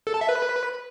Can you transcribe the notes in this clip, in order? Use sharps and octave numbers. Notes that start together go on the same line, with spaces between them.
A4
A5
E5
B4